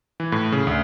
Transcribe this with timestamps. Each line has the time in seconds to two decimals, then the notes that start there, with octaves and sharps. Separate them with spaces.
0.20 E3
0.32 A2
0.52 C#3
0.67 D2